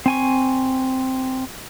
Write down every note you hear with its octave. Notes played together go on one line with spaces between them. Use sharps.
C4 G#5 C#6